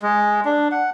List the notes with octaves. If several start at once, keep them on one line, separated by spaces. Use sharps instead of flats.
G#3
D4
F#5